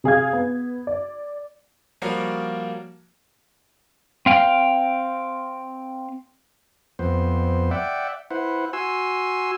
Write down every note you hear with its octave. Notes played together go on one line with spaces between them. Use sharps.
C3 G#4 F5 G#6
B3
D5
F3 G3 A#3 F#4 A#4 C#5
C4 F5 G5
F2 B3 C5
D5 E5 F#5 G5
E4 B4 C5 F#5
F#4 G#5 C6 E6